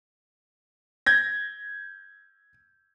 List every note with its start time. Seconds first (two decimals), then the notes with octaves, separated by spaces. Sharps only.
1.06 G6 G#6 A#6